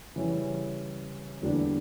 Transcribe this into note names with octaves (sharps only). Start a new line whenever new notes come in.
C#3 E3 G3 C#4
E2 D3 G3 A#3 D4